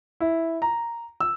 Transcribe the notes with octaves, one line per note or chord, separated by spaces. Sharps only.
E4
A#5
E6